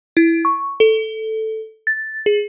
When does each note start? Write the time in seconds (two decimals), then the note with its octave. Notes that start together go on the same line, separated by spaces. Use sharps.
0.17 E4
0.45 C#6
0.80 A4
1.87 A6
2.26 G#4